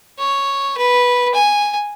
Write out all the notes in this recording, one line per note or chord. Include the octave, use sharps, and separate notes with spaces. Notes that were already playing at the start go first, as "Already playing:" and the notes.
C#5
B4
G#5